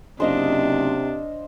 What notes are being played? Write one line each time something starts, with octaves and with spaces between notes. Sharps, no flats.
F#1 C3 D4 C5 D#5 F5